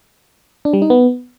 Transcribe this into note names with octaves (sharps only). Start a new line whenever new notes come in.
D4
G3
D#4
B3